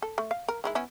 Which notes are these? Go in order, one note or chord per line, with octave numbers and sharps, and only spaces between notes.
A4
A3
F5
A#4
D#3 G#3 E4
B3 C#4 E4